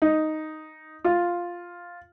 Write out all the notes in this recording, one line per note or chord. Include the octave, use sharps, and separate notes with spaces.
D#4
F4